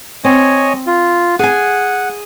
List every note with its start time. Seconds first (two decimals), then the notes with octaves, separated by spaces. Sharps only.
0.25 C4 C#5 D#5 G#5
0.87 F4
1.39 G#4 F#5 G#5